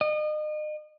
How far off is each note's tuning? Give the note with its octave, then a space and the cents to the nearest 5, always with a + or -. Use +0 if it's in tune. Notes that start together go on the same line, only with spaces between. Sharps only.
D#5 -35